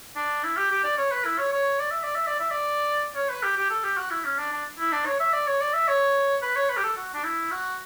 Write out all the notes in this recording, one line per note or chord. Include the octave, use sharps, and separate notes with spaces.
D4
E4
G4
G4
D5
C#5
B4
E4
C#5
C#5
D5
E5
D5
E5
D5
E5
D5
C#5
B4
G4
G4
A4
G4
F#4
E4
C#4
D4
D4
E4
D4
C#5
E5
D5
C#5
D5
E5
C#5
B4
C#5
B4
G4
A4
F#4
D4
E4
F#4